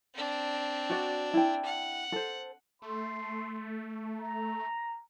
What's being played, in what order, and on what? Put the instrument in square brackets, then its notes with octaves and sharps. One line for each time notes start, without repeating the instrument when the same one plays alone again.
[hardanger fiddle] C4 D4
[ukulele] F#4 D5
E4 G5
[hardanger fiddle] F#5
[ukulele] A4 C5
[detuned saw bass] A3 [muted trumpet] C6
[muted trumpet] A#5